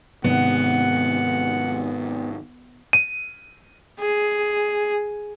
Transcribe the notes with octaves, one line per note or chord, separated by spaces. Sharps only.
G#2 C3 D#3 B3 F#5
D#7
G#4